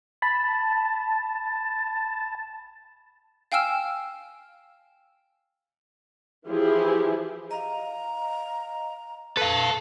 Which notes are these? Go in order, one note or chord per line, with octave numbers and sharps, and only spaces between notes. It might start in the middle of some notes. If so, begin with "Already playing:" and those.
A5 B5
F5 G5 G#5 E6 F6 E7
E3 F3 E4 G4 G#4
D#5 F5 A#5
A4 B4 F5